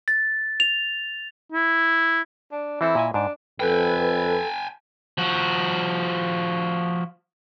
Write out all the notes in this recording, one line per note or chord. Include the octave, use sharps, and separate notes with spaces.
A6
F7
E4
D4
E3 C4 E4 A4
A#2 D#5 G#5
G#2 D4
F2 A4 B4 G5 G#5
F3 F#4